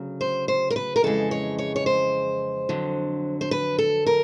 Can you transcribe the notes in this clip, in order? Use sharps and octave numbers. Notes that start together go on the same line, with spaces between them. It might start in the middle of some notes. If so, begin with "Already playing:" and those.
Already playing: D2 C#3 F#3
C5
C5
A#4
B4
A#4
F2 C#3 E3 G#3 A4
C#5
C#5
C#5
C5
F2 D3 F#3
C5
B4
A4
A#4